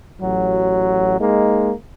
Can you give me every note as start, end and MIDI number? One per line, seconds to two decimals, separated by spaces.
0.20 1.18 33
0.20 1.18 54
1.19 1.72 56
1.19 1.72 58
1.19 1.72 63